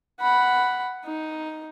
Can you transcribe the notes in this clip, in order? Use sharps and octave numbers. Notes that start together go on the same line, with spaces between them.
F#5 B5
D#4